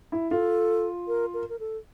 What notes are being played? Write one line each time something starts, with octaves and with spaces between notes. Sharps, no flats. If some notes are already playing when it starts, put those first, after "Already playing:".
E4
F4 A4
A#4
A#4
A#4
A4